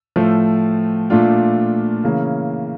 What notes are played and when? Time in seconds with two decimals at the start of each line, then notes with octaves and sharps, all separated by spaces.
0.16 A2 F3 A3
1.10 A#2 A3 D4 F4
2.04 C#3 E3 A#3 C#4